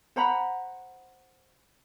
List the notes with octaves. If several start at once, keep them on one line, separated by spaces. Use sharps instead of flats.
C5 F#5 A#5 B5